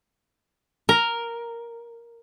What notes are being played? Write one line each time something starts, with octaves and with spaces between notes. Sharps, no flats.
A#4